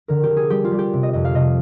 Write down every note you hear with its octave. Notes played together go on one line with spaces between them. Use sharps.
D3 A#4
G4
D3
G#4
G3 G4
F4
G3
G4
C3
D#5
F2 D#5
F5
C3 D#5